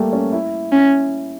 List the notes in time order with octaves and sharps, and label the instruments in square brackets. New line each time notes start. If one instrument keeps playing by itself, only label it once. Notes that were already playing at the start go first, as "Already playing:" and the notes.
Already playing: [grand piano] G3 A3 A#3
C#4
E4
[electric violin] C#4